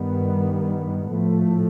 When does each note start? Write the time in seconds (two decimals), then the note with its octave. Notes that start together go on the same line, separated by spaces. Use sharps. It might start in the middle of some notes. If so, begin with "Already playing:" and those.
Already playing: G2 D#3 G3 B3
1.15 A2 F3 A3